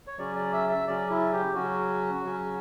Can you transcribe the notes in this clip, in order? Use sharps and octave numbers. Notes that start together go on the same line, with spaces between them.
C#5
C#3 F#3 C#4 D5
D5
E5
E5
C#3 F#3 C#4 D5
E4
G4
C#3 F#3 C#4 F#4
C#3 F#3 C#4